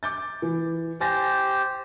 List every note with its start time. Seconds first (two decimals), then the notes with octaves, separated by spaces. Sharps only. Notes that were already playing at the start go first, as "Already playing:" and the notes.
0.03 D6 G6 A6
0.42 E3
1.01 G4 C5 G#5 A6 A#6